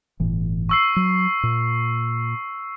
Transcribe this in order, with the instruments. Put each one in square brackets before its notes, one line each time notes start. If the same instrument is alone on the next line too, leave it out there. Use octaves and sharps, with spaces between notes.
[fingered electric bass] G1 A2 E3
[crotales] C#6 E6 C7
[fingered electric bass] F#3 [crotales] E6
[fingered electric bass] A#2